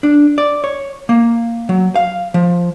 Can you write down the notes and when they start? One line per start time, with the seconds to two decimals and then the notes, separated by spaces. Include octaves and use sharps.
0.03 D4
0.38 D5
0.64 C#5
1.09 A#3
1.69 F#3
1.96 F5
2.34 F3